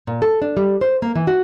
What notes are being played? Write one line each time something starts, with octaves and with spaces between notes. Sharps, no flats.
A#2
A4
D4
G3
C5
A#3
E3
F#4